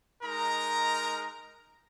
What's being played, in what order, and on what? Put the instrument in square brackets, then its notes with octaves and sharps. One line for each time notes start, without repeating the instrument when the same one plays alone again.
[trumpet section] G#3 D#4 A#4 A#5